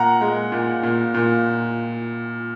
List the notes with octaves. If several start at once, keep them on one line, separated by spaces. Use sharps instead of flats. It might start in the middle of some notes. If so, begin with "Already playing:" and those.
Already playing: A#2 F#5 A#5
G#3
A#2
A#2
A#2